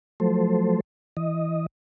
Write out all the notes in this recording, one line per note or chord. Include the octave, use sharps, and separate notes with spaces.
F3 F#3 A3 A4 C5
E3 D#5